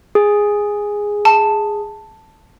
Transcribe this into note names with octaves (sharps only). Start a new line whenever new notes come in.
G#4
A5